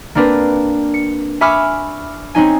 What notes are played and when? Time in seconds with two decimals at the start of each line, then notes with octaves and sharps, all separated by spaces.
0.15 A#3 C4 D4 A#4 B4
0.94 C#7
1.41 E5 G#5 B5 C#6 D6 F6
2.35 C4 C#4 D#4 G#5